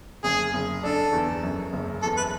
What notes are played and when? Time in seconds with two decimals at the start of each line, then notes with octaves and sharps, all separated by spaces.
0.24 F#1 G#4
0.54 F#1
0.83 D4 A4
1.12 E2
1.43 F#2
1.73 F#1
2.03 E2 A4
2.17 B4